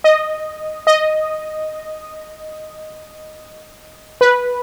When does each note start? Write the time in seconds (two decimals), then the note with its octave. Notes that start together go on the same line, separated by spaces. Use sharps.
0.04 D#5
0.87 D#5
4.21 B4